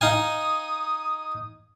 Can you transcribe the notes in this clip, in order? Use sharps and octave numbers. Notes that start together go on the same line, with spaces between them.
D#4 F5 G#5 D#6